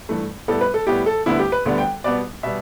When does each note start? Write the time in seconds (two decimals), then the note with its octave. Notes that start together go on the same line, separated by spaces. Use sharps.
0.09 G2 E3 A3
0.48 A2 G3 B3 A4
0.61 B4
0.74 A4
0.87 A2 G3 B3 G4
1.06 A4
1.26 D2 D3 G3 B3 E4
1.39 G4
1.52 B4
1.65 D2 D3 G3 B3
1.78 G5
2.04 B2 G3 B3 D5
2.43 B2 G3 B3 E5